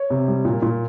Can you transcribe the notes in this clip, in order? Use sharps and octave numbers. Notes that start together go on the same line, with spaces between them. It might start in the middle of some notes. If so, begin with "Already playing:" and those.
Already playing: C#5
C3
G3
A#2
A#2